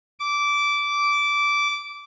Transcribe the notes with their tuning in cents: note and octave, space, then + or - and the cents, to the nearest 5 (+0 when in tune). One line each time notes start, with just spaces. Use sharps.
D6 -15